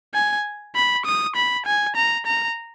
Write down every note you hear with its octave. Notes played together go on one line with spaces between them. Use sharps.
G#5
B5
D#6
B5
G#5
A#5
A#5